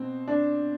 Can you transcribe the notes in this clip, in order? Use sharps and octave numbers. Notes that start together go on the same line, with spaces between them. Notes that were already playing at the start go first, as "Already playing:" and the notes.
Already playing: B2 C4
D4